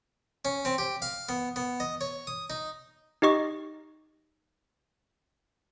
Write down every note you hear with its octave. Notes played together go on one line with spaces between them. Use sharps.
C#4
C4
G4
F5
B3
B3
D#5
C#5
D#6
D#4
D#4 G4 D#5 C#6